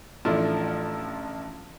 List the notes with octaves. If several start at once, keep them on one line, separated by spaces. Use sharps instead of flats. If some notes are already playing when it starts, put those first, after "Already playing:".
A1 F3 A3 D4 E4 F4